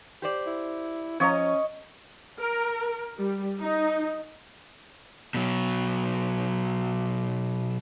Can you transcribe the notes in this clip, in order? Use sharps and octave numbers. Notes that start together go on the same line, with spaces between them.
G4 C5 D5
E4
F3 C#4 C#5 D#5 A#5
A#4
G3
D#4
B2 F#3